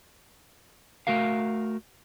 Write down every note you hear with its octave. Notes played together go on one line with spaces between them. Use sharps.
A3 F#4 A#4 F5